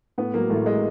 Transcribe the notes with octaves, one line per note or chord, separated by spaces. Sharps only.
A2 B3
F#3 A#3
A1 A3
G#3